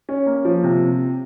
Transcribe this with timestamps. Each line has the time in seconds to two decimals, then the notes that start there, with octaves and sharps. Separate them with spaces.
0.09 C#4
0.26 A#3
0.45 F3
0.63 C3